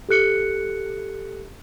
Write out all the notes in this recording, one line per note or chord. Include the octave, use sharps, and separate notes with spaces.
G4 A4 F#6 C#7